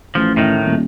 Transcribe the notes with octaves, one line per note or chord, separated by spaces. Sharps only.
A1 F3
A2 D#3
D#1